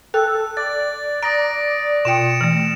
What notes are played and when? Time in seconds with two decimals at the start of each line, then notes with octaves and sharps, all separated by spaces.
0.14 A4 G5 F#6
0.57 D5 A6
1.23 A#5 D#6 A#6 D7
2.05 B2 F4 G5 C#7 D7 E7
2.41 E3 A3